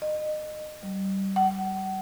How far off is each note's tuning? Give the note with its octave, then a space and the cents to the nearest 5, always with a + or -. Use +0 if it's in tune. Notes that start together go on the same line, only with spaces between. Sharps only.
D#5 -30
G3 -20
F#5 +35